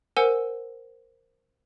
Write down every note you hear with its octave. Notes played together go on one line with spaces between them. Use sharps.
A#4 C5 F#5 G#5 E6